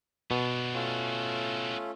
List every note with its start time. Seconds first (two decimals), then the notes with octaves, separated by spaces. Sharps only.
0.31 B2 B3 D4
0.74 A3 C#4 F4